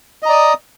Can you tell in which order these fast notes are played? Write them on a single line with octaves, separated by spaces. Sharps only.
D#5 A#5 D5 D#6